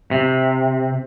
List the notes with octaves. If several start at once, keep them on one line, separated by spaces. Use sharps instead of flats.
C3